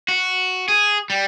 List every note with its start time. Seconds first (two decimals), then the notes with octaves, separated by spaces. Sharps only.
0.08 F#4
0.68 G#4
1.10 G3